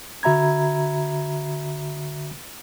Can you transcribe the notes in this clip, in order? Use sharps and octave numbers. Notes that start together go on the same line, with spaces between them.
D3 F#4 E5 A#5 B5 G#6